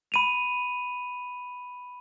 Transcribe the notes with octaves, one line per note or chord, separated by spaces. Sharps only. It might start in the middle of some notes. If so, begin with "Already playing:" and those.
B5 D#7 F7